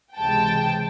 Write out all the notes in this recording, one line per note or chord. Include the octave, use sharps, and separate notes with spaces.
C#2 C3 E3 G#3 G5 A5